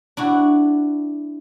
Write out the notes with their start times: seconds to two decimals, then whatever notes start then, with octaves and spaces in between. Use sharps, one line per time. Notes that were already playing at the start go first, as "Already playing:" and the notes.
0.17 D4 E4 F#4